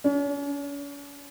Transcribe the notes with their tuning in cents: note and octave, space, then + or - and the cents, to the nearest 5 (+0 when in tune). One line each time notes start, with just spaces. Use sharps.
C#4 +40